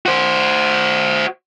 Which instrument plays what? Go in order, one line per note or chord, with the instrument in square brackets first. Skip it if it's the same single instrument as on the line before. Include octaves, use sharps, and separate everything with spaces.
[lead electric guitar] F#4 C5